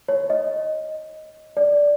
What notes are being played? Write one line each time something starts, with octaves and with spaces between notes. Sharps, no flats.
C#5
D#5
D5